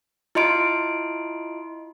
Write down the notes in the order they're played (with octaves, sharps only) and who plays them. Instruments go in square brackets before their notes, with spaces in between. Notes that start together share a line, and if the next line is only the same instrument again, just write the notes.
[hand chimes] E4 F4 D#5 C6 D7